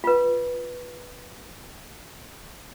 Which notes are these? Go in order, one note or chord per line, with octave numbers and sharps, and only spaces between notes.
F4 B4